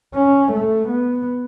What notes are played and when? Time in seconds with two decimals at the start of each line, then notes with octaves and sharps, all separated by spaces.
0.15 C#4
0.52 A3
0.89 B3